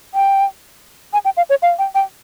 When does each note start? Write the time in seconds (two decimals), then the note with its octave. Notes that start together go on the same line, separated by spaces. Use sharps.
0.14 G5
1.13 G#5
1.25 G5
1.37 F5
1.50 C#5
1.62 F5
1.79 G5
1.95 G5